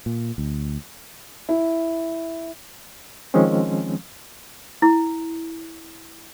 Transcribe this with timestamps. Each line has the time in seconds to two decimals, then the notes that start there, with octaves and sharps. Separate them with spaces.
0.06 A#2
0.38 D2
1.49 E4
3.34 D#3 F3 G#3 C4 C#4
4.82 E4